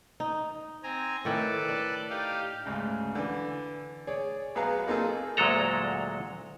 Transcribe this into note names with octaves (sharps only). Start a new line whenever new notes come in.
D#4
C4 G#5 A#5
A2 D#3 A4 B4 D5
D4
D#4 G4 F5
D2 G#2 C#3
D3 E3
G#4 C#5 D5
B1 B3 G#4 B4 F5 A#5
A#3 C4 D#4 F4 G#4 A4
D2 A#2 F#3 G#3 A4 A#5